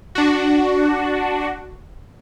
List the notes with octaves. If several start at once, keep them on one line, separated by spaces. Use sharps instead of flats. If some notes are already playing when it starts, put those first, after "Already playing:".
D4 F#4